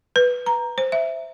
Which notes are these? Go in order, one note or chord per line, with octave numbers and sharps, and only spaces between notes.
B4
A#5
C5
E5